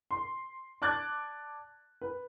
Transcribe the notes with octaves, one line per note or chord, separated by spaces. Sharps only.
C6
D5 A5 D6 F#6 G#6 A6
B4